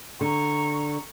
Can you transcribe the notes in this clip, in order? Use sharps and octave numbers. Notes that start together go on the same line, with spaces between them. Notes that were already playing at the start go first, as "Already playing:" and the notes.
D3 A#5 C#6